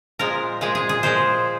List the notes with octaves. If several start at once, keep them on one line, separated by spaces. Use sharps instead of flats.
A#2 F3 G#3 A#4
A#2 F3 G#3 G#4
G#4
G#4
A#2 F3 G#3 C5